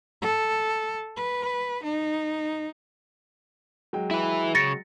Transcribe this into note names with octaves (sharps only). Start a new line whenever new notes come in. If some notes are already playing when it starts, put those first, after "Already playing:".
A4
B4
D#4
F#3 G#3 G5
E4 B4
C#3 A6 A#6 C#7